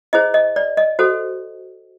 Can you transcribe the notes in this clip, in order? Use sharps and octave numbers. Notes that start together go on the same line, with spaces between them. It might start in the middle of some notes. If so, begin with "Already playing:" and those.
E4 G#4 C5 D#5
D#5
D5
D#5
F#4 A4 C5